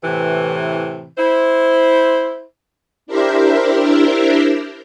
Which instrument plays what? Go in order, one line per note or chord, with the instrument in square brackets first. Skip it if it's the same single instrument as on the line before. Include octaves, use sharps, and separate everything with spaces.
[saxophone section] A2 C3 E3
E4 C5
[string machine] D4 E4 G4 A#4 C5 E5